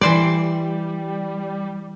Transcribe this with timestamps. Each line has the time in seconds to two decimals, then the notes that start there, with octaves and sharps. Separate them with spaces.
0.01 E3 G3 C5 D5